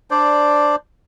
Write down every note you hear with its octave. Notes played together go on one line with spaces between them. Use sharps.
D4 C5 D5